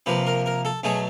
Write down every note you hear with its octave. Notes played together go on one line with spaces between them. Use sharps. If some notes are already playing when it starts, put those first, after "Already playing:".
C3 F3 A#3 B4
A#4
A#4
A4
B2 F#3 A3 G#4